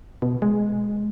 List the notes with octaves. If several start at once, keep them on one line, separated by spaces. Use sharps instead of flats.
B2
G#3